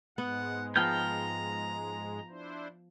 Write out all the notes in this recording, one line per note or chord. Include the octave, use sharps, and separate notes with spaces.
G#2 G#3 B3 F#5
F3 B3 G5 A#5 F6 G6
D4 E4 C5